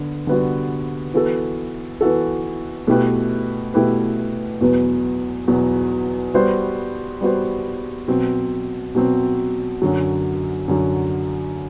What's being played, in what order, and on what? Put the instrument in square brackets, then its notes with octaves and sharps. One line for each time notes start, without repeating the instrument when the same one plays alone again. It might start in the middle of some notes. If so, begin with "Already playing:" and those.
Already playing: [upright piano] D3 B3
D3 G3 B3 D4 F#4
E3 B3 F#4 A4
E3 B3 F#4 A4
B2 A3 E4 G4 B4
B2 A3 E4 G4 B4
E2 B2 F#3 B3
E2 B2 F#3 B3
G3 B3 F#4 C5
G3 B3 F#4 C5
B2 F#3 C4
B2 F#3 C4
F#2 D3 F#3
F#2 D3 F#3